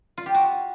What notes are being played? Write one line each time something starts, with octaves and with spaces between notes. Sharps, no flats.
F4
G4
F#4